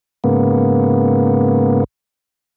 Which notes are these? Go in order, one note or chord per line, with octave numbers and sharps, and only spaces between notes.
G#2 C#3 A#3 B3